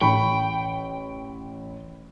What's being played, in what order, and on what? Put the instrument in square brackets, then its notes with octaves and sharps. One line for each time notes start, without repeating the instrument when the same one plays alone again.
[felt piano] A1 [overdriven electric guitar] G5 [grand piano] B5 C#6